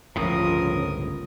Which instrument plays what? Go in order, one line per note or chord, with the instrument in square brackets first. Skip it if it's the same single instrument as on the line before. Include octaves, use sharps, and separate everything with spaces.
[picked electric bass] G1 C#2 A2 [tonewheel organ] C#3 C#4 [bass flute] F3 [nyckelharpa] A#4 D#6